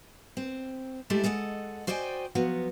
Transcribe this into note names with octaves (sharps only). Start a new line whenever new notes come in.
C4
G#3 A3 E4 G4 A4
G#3 A4 D#5 F#5
F#4 C5 D5 D#5 G5 G#5
F3 F#3 B3 F#4